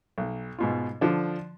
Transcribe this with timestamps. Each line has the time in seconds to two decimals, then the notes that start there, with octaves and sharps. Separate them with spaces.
0.18 B1
0.59 G#2 B2 F4
1.01 D3 F3 D4